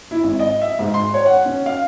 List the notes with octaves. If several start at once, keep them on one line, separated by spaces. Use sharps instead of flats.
E4
G#1
D#5
E5
G#2
C6
C#5
F#5
C#4
F5